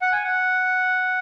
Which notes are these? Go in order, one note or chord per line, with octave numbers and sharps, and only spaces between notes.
F#5
G#5
F#5